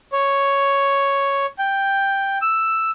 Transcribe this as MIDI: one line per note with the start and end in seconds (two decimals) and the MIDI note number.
0.13 1.46 73
1.59 2.38 79
2.42 2.91 88